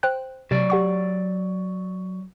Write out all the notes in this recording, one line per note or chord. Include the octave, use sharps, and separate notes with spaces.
C5 G5 F#6
C3 F#3 D5
G4 F#5 C#6